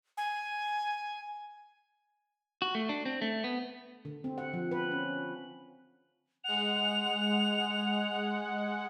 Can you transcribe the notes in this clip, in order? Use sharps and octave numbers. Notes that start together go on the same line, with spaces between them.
G#5
F#4
A3
D4
C4
A3
B3
D3
C4
F#5
F3
B4
C#4
G#3 F#5 F7